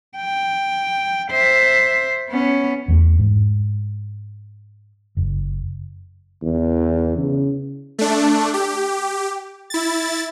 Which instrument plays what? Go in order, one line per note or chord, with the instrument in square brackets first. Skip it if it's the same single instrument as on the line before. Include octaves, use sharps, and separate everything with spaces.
[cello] G5
C5 E5
B3 C#4
[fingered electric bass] E2 G#3 A3
G#2
F#1
[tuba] E2
C#3
[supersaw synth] A3 D4
G4
E4 A6